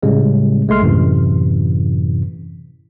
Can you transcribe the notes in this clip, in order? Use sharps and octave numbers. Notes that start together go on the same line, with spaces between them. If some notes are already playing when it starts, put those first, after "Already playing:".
A2 C#3 G3 G#3 C#4
B1 G#3 A3 C6 F6
F#2 A2 C3 E3